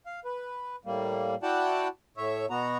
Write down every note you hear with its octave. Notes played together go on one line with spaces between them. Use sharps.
F5
B4
A2 G3 A#3
E4 F#4 D5 F#5 G5 A5
A2 C#5 E5
B2 B3 F#4 A#5